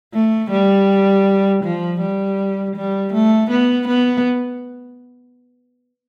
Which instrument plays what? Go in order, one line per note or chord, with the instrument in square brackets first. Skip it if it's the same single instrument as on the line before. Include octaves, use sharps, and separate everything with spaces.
[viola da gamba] A3
G3
F3
G3
G3
A3
B3
B3